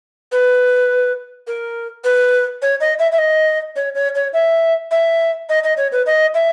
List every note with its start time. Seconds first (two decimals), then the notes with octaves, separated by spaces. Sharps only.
0.32 B4
1.47 A#4
2.04 B4
2.62 C#5
2.81 D#5
2.99 E5
3.12 E5
3.18 D#5
3.76 C#5
3.95 C#5
4.15 C#5
4.33 E5
4.91 E5
5.49 D#5
5.64 D#5
5.77 C#5
5.92 B4
6.06 D#5
6.34 E5